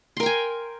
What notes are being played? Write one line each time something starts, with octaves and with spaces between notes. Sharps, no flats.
A#4 G5 G#5 C6